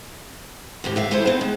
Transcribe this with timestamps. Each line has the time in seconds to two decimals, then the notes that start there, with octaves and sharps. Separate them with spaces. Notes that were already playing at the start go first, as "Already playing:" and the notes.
0.84 D#2 G#2 G4
0.96 D#2 E5 F5
1.11 E3 A3 E4 G#4 A4 C5
1.25 B3 C4 D#4 B4 F5 A5
1.41 G#3